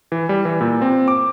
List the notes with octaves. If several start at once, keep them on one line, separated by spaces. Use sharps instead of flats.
E3
G3
E3
A#2
C4
D6